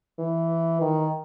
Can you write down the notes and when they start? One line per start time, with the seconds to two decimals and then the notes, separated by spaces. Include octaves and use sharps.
0.19 E3
0.81 D#3